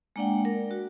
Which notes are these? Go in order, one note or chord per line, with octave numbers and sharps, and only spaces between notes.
G#3 A#3 D4 D5 F#5 G5
A#4
F#4